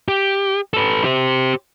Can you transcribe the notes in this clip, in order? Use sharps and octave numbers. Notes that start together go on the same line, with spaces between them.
G4
A4 B4
G4 C5